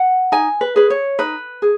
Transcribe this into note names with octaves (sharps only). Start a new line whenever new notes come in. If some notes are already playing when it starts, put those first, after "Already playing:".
Already playing: F#5
D#4 G#5
B4
G#4 B4
C#5
D#4 B4
G#4